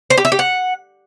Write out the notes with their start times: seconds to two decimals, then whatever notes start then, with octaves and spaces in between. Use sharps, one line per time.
0.10 C5
0.18 G4
0.25 E5
0.32 G4
0.39 F#5